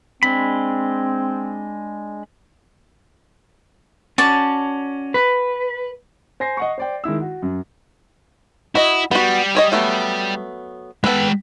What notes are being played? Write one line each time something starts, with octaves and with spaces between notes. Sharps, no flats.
G#3 C4 D4 B5
C#4 F#4 D5 A5
B4
C5 G#5 A#6 C7
D#5 F#5 C#6
C5 D5 G5
D#3 G#3 E4 E6
F#4
F#2
E4 F#4 D#5
G3 B3 F#4
G#4 C#5 D#5
F#3 A3 B3
G#3 B3 A4 B4 G5